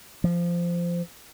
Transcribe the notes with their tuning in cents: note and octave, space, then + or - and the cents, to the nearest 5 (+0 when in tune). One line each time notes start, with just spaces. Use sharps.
F3 -15